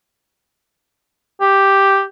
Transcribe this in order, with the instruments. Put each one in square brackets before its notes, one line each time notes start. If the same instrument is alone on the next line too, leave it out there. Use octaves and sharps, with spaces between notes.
[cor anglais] G4